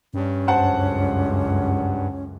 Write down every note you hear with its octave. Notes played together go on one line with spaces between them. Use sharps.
G2 C#4
C#2 F#2 C5 F#5 A5